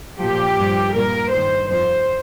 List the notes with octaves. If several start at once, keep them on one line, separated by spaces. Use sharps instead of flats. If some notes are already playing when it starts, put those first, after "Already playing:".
A#2 F3 G4
G2 F3
A#2 G3 A#4
G2 D#3 G3 C5
F2 F3 C5